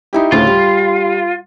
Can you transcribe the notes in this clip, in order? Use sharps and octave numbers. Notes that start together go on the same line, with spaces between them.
D#4 E4 G4
D2 A2 C#3 F4
G3